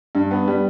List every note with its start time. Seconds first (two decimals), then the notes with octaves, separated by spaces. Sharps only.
0.15 G2
0.31 B3
0.48 G3